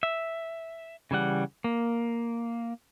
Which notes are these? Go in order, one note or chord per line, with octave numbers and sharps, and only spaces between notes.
E5
C#3 E3 G3 F#5
A#3